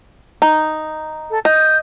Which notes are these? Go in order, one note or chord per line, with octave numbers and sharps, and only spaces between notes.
D#4
A4
D#5 G6